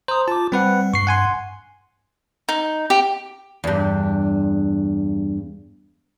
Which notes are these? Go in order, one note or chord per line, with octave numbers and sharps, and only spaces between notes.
C5 A#5 D#6
F4 A5 D6
G3 C4 B4 F#5
G2 C#6 C7
F#5 G#5 C6
D#4
G4
E2 G2